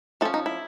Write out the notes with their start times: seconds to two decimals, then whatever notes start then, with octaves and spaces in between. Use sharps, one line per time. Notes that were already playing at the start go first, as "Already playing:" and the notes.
0.21 F3 A3 A4
0.25 C#4
0.34 D#4
0.46 E4